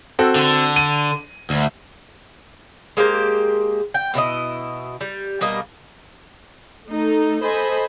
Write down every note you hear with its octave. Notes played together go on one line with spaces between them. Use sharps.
C4 F#4 A4
D3
D#7
D2
G#3 A#3 G4 C5
G5
B2 E4 F4 D#5
G3
B2 G3 A#3 D#5
A3 D#4 A4
A4 C5 D#5 G#5 B5